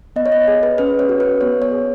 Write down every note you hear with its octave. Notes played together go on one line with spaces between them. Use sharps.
B3 D#5
C#5
D#5
G#4
B4
C#4 B4
C#5
F#4
B4
B3 C#5
C#5
G#4